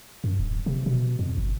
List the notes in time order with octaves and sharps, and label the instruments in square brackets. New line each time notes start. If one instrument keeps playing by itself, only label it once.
[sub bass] F#2
D1
C3
B2
F2
G1